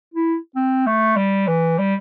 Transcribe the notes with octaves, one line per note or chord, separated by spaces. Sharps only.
E4
C4
A3
G3
E3
G3